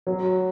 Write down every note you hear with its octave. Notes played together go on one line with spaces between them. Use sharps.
F#3